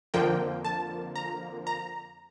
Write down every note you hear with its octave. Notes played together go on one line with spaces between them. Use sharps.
F2 D3 F3 A#3 G5
A5
A#5
A#5